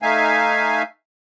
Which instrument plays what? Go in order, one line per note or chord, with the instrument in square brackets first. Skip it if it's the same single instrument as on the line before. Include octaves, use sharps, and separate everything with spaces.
[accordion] A3 D#4 E5 F5 G#5